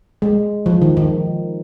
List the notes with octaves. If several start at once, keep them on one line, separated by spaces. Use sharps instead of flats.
G#3
F3
D#3
D#3